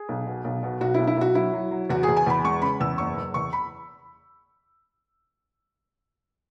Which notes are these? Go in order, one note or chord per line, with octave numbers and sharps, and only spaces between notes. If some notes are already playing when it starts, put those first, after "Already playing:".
Already playing: G#4
B1
B2
B1
B2
B1 F#4
B1 E4
E4
B1 F#4
F#3 E4
F#3
F#3
E2 F#4
G#4
E2
G#5
E2 B5
G#3 C#6
C#3 B5
E2 E6
F#1 C#6
F#1
E2 C#6
B5